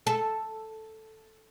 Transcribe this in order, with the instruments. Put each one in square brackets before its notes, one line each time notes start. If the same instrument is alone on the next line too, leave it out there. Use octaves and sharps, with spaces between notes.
[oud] A4